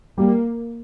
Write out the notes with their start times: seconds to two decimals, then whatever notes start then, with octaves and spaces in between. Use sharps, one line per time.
0.18 G3 A#3